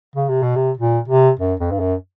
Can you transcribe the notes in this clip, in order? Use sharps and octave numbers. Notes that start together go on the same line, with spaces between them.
C#3
C3
B2
C3
A#2
C3
F#2
F2
G2
F#2